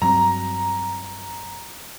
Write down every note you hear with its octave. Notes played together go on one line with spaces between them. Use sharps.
G2 F#3 C4 A#5